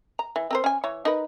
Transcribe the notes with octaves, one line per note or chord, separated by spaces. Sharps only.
A#5
E3
C4 A#4 C5
C#4 G#5
E3 C#5
D#4 A#4 B4